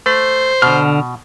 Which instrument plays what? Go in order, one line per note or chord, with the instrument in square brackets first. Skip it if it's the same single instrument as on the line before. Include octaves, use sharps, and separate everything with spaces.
[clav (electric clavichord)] A3 [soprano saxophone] C5
[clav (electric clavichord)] B2 [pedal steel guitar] D3 F6